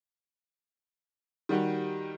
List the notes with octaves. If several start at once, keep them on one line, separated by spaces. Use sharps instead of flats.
D#3 G3 F#4 G4